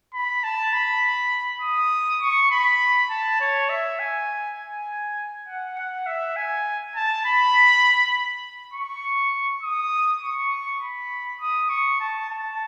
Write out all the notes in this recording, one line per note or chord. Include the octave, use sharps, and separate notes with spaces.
B5
A5
B5
D#6
C#6
B5
A5
C#5
E5
G#5
G#5
F#5
F#5
E5
G#5
A5
B5
C#6
D#6
C#6
B5
D#6
C#6
A5
A5